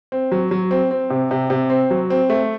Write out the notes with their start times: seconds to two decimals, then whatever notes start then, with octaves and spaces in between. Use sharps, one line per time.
0.12 C4
0.32 F#3
0.51 F#3
0.71 C4
0.91 C4
1.10 C3
1.31 C3
1.50 C3
1.70 C4
1.91 F#3
2.10 C4
2.30 A3